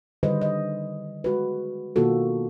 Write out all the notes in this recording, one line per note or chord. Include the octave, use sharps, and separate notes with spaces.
D3 D#3 G3 B4 C5 D#5
D#5
G#3 F#4 B4
B2 D#3 A#3 F4 F#4 A4